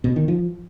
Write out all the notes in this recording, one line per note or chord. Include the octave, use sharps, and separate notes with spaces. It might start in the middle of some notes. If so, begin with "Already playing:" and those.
B2
D#3
F3